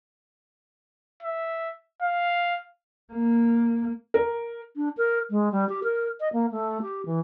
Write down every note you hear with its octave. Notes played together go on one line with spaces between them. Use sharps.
E5
F5
A#3
A#4
D4
A#4
G#3
G3
G4
A#4
D#5
A#3
A3
G4
E3